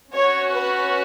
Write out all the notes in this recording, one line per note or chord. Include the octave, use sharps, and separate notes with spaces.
C#4 F#4 C#5
B4